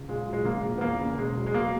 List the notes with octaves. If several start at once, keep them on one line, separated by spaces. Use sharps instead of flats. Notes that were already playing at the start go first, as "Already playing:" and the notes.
Already playing: C#2
A#2 G#3
F#3
G#3
A#1 A#3
A#1
B3
E2 A#3
C#3
E1 G#3
F#3
G#3
B2 A#3